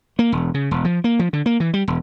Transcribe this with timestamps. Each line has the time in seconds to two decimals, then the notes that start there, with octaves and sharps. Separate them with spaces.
0.19 A#3
0.32 E1
0.54 C#3
0.71 E1
0.85 F3
1.04 A#3
1.19 F3
1.33 D3
1.46 A#3
1.60 E3
1.74 G3
1.88 E1